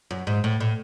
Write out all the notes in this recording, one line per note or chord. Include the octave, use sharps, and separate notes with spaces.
F#2
G#2
A2
A2